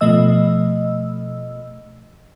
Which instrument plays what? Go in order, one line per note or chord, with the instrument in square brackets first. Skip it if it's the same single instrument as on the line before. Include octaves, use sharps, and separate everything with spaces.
[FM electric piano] B2 F3 A3 D#5 E6